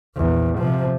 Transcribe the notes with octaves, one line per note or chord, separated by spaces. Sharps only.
A#1 E2
C3 F3